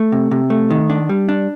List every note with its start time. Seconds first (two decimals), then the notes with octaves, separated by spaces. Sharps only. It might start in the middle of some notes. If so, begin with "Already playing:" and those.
Already playing: A3
0.12 C3
0.31 C3
0.50 A3
0.70 D#3
0.90 D4
1.09 G3
1.29 D4